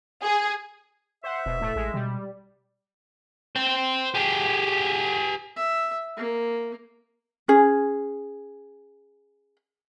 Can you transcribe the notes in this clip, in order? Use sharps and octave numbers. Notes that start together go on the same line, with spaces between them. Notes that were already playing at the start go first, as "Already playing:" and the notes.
G#4
C5 E5 F#5
D#1 B2
A2 A3
A1 G#3
B2 G3
C5 G5
G4 G#4
E5
A#3
C#4 G#4